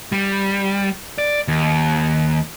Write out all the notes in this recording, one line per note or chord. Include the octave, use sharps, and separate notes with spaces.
G3
D5
D#2